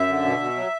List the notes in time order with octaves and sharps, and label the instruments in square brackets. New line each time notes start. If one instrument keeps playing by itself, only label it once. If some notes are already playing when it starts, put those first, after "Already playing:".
Already playing: [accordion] F#2 E5
D3
B2
B2
F#3